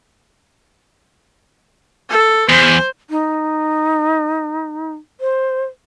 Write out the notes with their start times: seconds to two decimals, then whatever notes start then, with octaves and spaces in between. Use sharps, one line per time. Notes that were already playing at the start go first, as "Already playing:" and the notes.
2.10 A4
2.49 E2 C5
3.10 D#4
5.21 C5